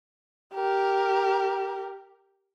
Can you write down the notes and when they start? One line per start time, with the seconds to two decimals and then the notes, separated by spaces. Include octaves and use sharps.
0.54 G4 A#4